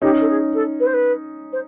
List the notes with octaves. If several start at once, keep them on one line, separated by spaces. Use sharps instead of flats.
C#4 D#4 G4
A4
G#4
A4
B4
C5
B4
C5